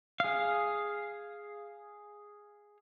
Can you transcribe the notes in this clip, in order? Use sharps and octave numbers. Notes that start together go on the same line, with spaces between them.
G#4 F5